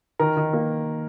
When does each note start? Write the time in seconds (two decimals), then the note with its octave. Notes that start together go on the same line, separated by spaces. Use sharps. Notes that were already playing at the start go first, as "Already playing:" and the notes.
0.19 D#3 A#4
0.37 D#3
0.53 A#3